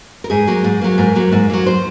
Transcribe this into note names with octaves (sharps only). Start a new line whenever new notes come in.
A#4
G#2 G#4
F#3 A#3
G#2
F#3 A#3
G#2 A#4
F#3 A#3
G#2
F#3 A#3
C5